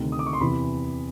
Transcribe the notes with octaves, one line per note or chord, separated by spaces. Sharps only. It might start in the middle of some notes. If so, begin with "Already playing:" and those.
Already playing: D2 C3 D#3
D#6
D6
C#6
C6
E2 C3 E3 B5